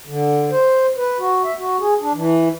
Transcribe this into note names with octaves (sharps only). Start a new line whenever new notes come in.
D3
C5
B4
F#4
E5
F#4
G#4
D4
E3